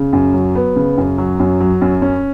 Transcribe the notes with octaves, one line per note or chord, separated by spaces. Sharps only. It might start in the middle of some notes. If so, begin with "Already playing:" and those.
Already playing: C#3
F#2
F#3
B3
C#3
F#2
F#3
F#2
F#3
F#2
C#4